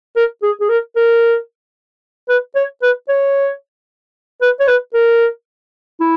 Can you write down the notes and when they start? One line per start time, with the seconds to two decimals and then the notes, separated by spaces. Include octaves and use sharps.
0.16 A#4
0.43 G#4
0.61 G#4
0.69 A#4
0.96 A#4
2.29 B4
2.55 C#5
2.82 B4
3.09 C#5
4.42 B4
4.60 C#5
4.68 B4
4.94 A#4
6.00 E4